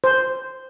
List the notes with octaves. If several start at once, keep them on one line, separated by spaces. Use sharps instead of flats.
C5